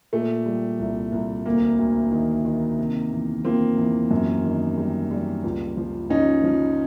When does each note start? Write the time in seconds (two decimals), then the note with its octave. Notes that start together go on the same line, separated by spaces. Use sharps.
0.13 A#2 A3
0.46 G3
0.79 C2
1.12 C2
1.45 D2 A#3
1.79 D2
2.12 D#3
2.45 D#3
2.79 C3
3.12 E2
3.45 F3 A#3 C4
3.77 E2
4.11 F#2
4.44 D#3
4.78 G3
5.11 G3
5.44 C#2
5.77 F3
6.10 C#2 C#4 D#4
6.44 F3